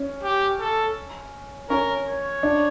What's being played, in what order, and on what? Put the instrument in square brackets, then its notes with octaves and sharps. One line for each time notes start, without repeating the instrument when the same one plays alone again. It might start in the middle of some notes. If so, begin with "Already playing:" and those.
Already playing: [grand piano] C#4
[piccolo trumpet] G4
A4
[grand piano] C#4 [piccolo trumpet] A#4
[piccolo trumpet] C#5
[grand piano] D4